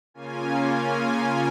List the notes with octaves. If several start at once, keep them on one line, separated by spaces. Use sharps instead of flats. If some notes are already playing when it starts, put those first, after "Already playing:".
C#3 A#3 C#4 F4 G#5
G#5